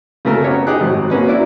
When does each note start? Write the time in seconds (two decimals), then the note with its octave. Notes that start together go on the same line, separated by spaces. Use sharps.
0.25 C#3 F#3 A3 A4 A#4
0.44 B3 G4 C#5
0.67 D#4 G4 G#4 F#6
0.81 G#1 F#3
1.10 F#3 A#3 C#4 B4
1.28 F#3 E4 D5